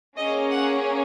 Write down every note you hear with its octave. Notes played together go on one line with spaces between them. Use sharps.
A#3 C#4 G#4 D#5
F#5